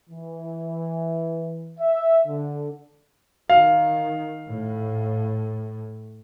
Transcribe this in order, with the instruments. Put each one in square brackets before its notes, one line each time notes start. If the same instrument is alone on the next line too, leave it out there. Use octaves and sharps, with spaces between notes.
[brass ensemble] E3
E5
D3
[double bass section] D#3 [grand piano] F5
[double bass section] A2